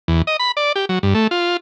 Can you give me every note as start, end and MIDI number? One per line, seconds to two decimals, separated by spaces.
0.08 0.22 40
0.27 0.37 75
0.39 0.52 83
0.57 0.72 74
0.76 0.85 67
0.89 0.99 54
1.03 1.14 43
1.15 1.27 57
1.31 1.57 65